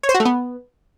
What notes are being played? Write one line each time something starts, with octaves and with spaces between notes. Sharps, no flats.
C#5
C5
F#4
A3
B3